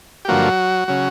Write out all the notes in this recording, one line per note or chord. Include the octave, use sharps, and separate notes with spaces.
G4
G2 D3 F3 F#3 A#3 F#4
C#3 F#3